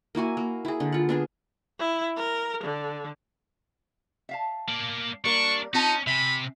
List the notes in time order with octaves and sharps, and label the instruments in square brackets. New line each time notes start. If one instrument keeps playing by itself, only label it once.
[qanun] A#3 E4 F#4 G#5
A#3
E4 G#4
D3
F4 F#5
B3 D4 G#4
[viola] E4
A#4
D3
[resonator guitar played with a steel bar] E5 F5 A5
[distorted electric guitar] A#3 D5
[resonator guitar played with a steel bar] G3 A#3 A#4 [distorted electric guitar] D4 [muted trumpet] C#6
[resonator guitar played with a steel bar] C4 F4 A5 [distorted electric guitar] C#4 [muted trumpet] D#4
[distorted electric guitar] C3 [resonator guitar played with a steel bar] E5 G#5 [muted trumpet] B5